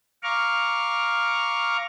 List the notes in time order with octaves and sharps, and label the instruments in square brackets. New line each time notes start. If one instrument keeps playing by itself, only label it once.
[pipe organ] F5 A#5 C#6 D6 F6